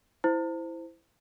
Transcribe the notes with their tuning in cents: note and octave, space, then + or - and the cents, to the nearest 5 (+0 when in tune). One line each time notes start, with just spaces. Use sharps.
E4 +0 C5 -15